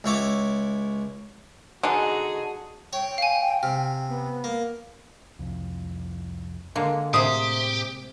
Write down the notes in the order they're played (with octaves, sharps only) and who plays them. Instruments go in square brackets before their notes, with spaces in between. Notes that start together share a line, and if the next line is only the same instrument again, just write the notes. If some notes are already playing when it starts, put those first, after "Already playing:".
[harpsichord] C#2 E4 C#5 D6
[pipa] D3 [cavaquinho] D#4 A4 [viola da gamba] F#4 G#4 [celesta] D#5 F#5 G#5
[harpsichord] C#5 [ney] G5
[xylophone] F5 G#5
[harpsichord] C3 [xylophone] F6
[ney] B3
[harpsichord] A#3
[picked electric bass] C2 F2
[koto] D3 G#3 A#3
[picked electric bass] A2 A3 C4 [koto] C3 G#4 C5 [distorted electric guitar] G4 [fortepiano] D#6